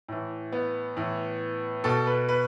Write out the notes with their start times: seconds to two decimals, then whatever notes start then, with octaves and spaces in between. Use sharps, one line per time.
0.08 A2 E3
0.52 B3
0.97 A2 E3
1.84 B2 A4
2.07 B4
2.29 B4